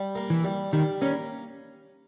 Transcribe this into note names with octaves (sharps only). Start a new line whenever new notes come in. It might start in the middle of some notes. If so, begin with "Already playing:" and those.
Already playing: G3
A#3
E3
G3
D#3 G3
A#3 C#4